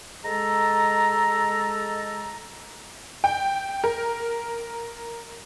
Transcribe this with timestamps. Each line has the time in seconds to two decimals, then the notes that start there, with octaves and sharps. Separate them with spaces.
0.25 G#3 A4 A#5
3.24 G5
3.84 A#4